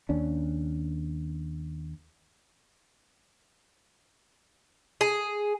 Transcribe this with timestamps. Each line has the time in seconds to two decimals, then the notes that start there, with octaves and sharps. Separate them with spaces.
0.09 D#2 C#4 D4
5.01 G#4